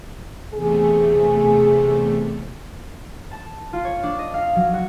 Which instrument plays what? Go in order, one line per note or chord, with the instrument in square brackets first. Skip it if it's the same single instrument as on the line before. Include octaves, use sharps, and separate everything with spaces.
[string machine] E2 C3 A3 [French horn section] G#4
[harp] A5
F4
C#5
D4
D#5
F5
F#3
F#4